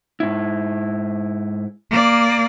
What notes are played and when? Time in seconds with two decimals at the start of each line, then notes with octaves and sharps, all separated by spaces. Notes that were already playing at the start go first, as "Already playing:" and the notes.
0.20 G#2 E4
1.90 A#3 D5